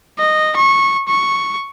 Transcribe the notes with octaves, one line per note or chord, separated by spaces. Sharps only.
D#5
C#6
C#6